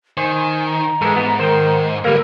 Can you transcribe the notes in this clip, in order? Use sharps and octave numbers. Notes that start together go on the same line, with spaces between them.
D#3 C5 G#5
A#5
G#2 E3 G#3 A4
B3
D#3 C5 G5
D3 G3 A#3 A#4 B4 E6